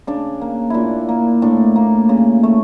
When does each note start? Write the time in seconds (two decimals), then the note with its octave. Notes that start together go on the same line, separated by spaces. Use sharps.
0.07 C#3 D4
0.41 A#3
0.70 A#2 D4 E4
1.09 A#3
1.42 A2 D4
1.76 A#3
2.09 C#3
2.43 A3